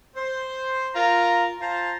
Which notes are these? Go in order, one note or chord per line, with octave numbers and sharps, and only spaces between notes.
C5
F4 A#4 A#5
F4 C5 A5 A#5